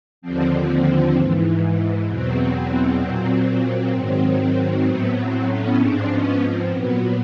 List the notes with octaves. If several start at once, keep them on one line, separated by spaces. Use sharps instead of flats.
D#2 D3 F3 C4
G#2 E3
E2 B2 F#3 C4
A#2 F#3
G#2 D#3 F#3
A2 F#3 B3
C4
B3 C#4
G#2 F3 C4 D4
B3 C#4
C4
A#2 F#3 B3